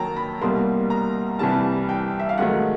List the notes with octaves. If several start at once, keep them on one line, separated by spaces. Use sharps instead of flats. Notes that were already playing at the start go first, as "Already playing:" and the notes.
Already playing: F#2 D#3 F#3 A#3 C#5 G5 A5 A#5
B5
C2 B2 G3 A#3 C6
A#5
C2 C3 E3 G3 A5
G5
E5
F5
G#2 D#3 F#3 A3 F#5